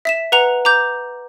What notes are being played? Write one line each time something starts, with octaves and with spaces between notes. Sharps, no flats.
E5 B6 E7
B4 F#5 A#5 F7
A#5 D6 G6